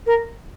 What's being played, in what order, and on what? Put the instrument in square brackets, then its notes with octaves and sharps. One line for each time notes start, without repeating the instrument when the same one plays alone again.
[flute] A#4